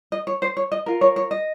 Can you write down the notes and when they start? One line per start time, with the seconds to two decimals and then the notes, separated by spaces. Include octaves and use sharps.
0.12 D#5
0.27 C#5
0.42 C5
0.57 C#5
0.72 D#5
0.86 F4 A#4
1.01 C#5
1.16 C#5
1.31 D#5